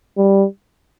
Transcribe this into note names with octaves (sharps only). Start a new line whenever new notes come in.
G3